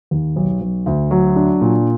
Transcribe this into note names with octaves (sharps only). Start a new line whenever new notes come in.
D#2
B1
B1
D2
F#3
D4
A#2